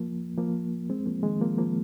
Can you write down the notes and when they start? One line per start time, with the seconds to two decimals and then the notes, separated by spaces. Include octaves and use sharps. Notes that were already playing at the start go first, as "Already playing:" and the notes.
Already playing: F3 A#3
0.38 F3 A#3
0.90 G#3 C4
1.06 F3 A#3
1.23 D#3 G#3
1.41 F3 A#3
1.58 F3 A#3